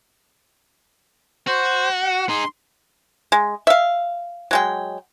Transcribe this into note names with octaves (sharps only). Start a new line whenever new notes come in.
F#4 C5
F#5
D#4 G#4 C6
G#3
E5 F5
F#3 G#3 G5